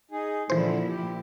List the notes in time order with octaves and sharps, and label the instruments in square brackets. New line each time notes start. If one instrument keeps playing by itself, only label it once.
[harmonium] D#4 G#4
[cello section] A#2 F3 E4 [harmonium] D3 [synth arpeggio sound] E3 C5
[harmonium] G4